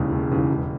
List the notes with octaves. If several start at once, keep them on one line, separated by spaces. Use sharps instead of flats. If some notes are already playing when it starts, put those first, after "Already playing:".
Already playing: E1 D#2 C#3 E3
E1
D#2 C#3 E3
E1